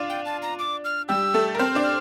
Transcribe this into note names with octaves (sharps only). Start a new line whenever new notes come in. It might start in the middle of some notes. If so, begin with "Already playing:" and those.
Already playing: D4 F4 D5 F5
G5
A5
A#5
D6
F6
G3 G4 E6
A3 A4
A#4
C4 C5 F6
D4 D5
F6